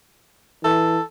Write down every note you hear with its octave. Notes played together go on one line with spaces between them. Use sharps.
E3 A4